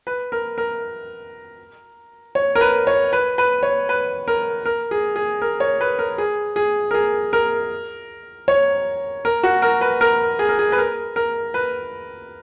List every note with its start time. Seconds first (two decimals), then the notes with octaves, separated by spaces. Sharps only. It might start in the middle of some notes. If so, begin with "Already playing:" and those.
0.07 B4
0.32 A#4
0.58 A#4
2.35 C#5
2.55 A#4
2.61 B4
2.87 C#5
3.13 B4
3.38 B4
3.63 C#5
3.89 B4
4.28 A#4
4.66 A#4
4.91 G#4
5.16 G#4
5.42 A#4
5.60 C#5
5.81 B4
5.99 A#4
6.18 G#4
6.56 G#4
6.91 A#4
6.94 G#4
7.33 A#4
8.48 C#5
9.25 A#4
9.43 F#4
9.62 A#4
9.81 B4
10.01 A#4
10.39 G#4
10.49 A#4
10.59 G#4
10.72 B4
10.78 A#4
11.16 A#4
11.54 B4